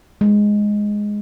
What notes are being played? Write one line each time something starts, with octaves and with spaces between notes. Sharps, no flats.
G#3